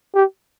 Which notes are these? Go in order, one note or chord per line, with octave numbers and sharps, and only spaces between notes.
G4